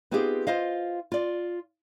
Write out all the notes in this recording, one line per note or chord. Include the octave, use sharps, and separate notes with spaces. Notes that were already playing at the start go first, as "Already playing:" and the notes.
B3 C4 D#4 F4 G4 G#4
F4 C5 D#5 F5
F4 D5